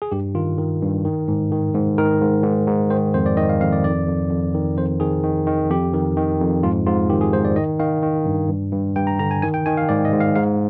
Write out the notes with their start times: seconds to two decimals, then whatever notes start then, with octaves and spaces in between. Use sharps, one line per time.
0.02 G#4
0.12 G2 G4
0.35 D#3 F4
0.58 D#3
0.82 G2
1.05 D#3
1.28 G#2
1.52 D#3
1.75 G#2
1.98 D#3 A#4
2.21 G#2
2.44 G#2
2.68 G#2
2.90 D#3 C5
3.14 F2 C5
3.26 D5
3.37 D#3 D#5
3.49 F5
3.61 F2 F5
3.72 D5
3.84 F2 D5
4.07 F2
4.31 F2
4.54 D#3
4.77 F2 C5
5.00 D#3 G#4
5.24 D#3
5.47 D#3
5.70 F2 G4
5.93 D#3
6.17 D#3
6.40 F2
6.63 G#2 F4
6.86 G#2 F4
7.09 D#3 G4
7.21 G#4
7.33 G#2 C5
7.45 D5
7.56 D#3 D#5
7.80 D#3 F5
8.03 D#3
8.26 G2
8.49 G2
8.73 G2
8.96 G2 G5
9.07 A#5
9.19 D3 A#5
9.31 G#5
9.42 D#3 G#5
9.54 G5
9.66 D#3 G#5
9.77 F5
9.89 G#2 D5
10.05 D#5
10.12 G#2
10.20 F5
10.35 G#2 F5